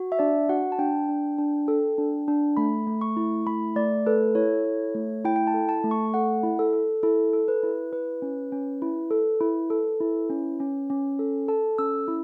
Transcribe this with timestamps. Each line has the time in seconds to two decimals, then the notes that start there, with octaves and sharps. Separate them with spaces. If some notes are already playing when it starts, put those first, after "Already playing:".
Already playing: F#4
0.12 E5
0.19 D4 D5
0.49 F#4 F#5
0.72 A5
0.79 D4 G5
1.09 D4
1.38 D4
1.68 A4
1.98 D4
2.28 D4
2.57 A3 B5
2.87 A3
3.01 C#6
3.17 E4
3.47 A3 B5
3.76 A3 D5
4.06 A4 B4
4.35 E4 C#5
4.65 A4
4.94 A3
5.25 E4 G5
5.36 G5
5.47 A5
5.54 A4
5.69 A5
5.84 A3
5.91 C#6
6.14 A4 F#5
6.43 E4
6.59 A4
6.73 A4
7.03 E4 A4
7.33 A4
7.48 B4
7.63 E4
7.92 E4 B4
8.22 C#4
8.52 C#4
8.82 E4
9.11 A4
9.41 E4
9.70 A4
10.01 E4
10.30 C#4
10.60 C#4
10.90 C#4
11.19 A4
11.48 A4 A5
11.78 C#4 E6
12.08 E4